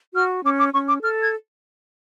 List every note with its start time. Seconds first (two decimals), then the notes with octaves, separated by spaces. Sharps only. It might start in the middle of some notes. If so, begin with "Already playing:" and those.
0.15 F#4 F6
0.44 C#4 D6
0.58 D6
0.73 C#4 C#6
0.88 D6
1.02 A4 F6
1.22 G#6